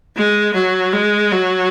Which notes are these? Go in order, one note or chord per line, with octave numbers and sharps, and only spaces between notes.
G#3
F#3
G#3
F#3